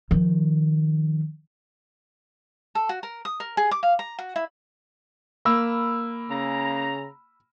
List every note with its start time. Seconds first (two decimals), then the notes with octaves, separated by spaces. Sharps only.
0.11 D#3 F3
2.75 A4
2.89 F#4
3.03 A#4
3.25 D#6
3.40 A#4
3.57 G#4
3.71 D6
3.83 F5
3.99 A#5
4.19 F#4
4.36 E4
5.45 A#3 B5 E6
6.30 C#3 A#5